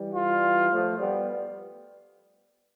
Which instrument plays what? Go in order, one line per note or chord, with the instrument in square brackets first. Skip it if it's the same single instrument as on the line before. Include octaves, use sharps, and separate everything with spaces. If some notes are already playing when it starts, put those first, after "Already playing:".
Already playing: [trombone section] E3 G3
[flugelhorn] F4
[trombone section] F3 A3
G3 B3